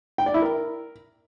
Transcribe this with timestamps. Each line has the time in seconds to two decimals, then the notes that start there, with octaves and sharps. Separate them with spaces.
0.18 G5
0.26 D5
0.34 E4
0.42 A#4